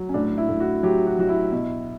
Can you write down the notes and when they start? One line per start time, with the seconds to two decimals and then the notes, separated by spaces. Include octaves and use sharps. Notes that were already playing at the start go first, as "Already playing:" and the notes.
Already playing: F#3
0.09 C#4
0.14 A2 D4
0.38 E4
0.49 A2
0.60 F#4
0.83 F#3 G4
1.06 F#4
1.18 F#3 F#4
1.29 E4
1.52 B2